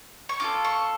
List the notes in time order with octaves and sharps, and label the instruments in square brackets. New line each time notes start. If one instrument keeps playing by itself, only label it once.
[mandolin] C#6
C#4 F4 A4 D6
C#6